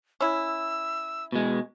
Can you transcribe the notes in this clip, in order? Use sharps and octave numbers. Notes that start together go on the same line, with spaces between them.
C#4 E4 E6
B2 G#3